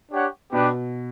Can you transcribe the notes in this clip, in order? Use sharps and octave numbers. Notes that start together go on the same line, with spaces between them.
D4 G4 C#5 F#5
B2 B3 D4 G4 B4